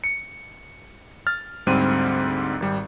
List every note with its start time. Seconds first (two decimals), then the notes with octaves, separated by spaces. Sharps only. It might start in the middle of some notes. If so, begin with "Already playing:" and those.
0.04 C#7
1.27 F6 A6
1.67 D2 G#2 G3 C4 D#7
2.60 G#1 G3